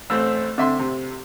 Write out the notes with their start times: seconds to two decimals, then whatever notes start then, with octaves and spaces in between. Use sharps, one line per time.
0.10 A1 A3 C4 E6
0.58 D3 C4 E5 C6
0.79 C3